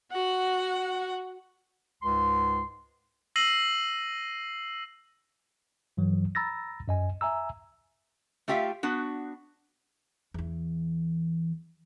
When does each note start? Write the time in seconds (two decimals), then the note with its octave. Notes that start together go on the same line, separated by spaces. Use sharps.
0.11 F#4 F#5
2.03 C#2 G#2 C6
3.36 E6 A#6 C7 D#7 F#7
5.97 G2 E3 F#3
6.35 A#5 B5 E6 A6 A#6
6.88 F#2 D#5 G#5
7.21 E5 G#5 A#5 E6
8.48 A3 F4 G4 E5 F5
8.83 B3 D4 F#4
10.34 E2 E3